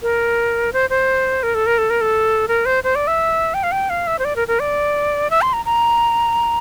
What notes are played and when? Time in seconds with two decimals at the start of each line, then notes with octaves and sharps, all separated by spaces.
0.02 A#4
0.73 C5
0.90 C5
1.43 A#4
1.55 A4
1.67 A#4
1.78 A4
1.90 A#4
2.01 A4
2.48 A#4
2.66 C5
2.84 C5
2.95 D5
3.07 E5
3.54 G5
3.63 F5
3.72 G5
3.90 F5
4.07 E5
4.19 C5
4.25 D5
4.36 A#4
4.48 A#4
4.60 D5
5.30 E5
5.42 C6
5.53 A#5
5.65 A#5